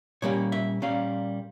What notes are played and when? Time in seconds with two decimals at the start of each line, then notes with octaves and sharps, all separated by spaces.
0.22 A#2 G3 A#3 C#4 C#5
0.52 E5
0.82 A#2 G3 A#3 C#4 F5